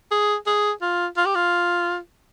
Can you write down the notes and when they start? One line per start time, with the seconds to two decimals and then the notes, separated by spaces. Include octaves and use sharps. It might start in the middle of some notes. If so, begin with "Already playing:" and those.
0.11 G#4
0.46 G#4
0.81 F4
1.17 F4
1.26 G4
1.35 F4